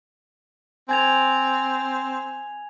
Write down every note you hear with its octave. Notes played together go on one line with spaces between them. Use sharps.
C4 G#5 G#6 F7